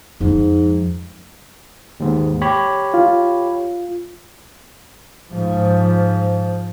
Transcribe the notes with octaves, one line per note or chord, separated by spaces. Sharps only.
F2 G#2 F3
D#2 G#2
G4 C#5 B5
F4
G#2 F3